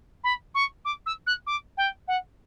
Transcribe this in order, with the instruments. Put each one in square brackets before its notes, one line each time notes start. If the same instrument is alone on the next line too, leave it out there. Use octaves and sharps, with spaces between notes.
[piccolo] B5
C#6
D6
E6
F#6
D6
G5
F#5